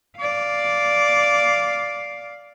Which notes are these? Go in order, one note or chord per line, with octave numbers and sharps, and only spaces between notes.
D5 F5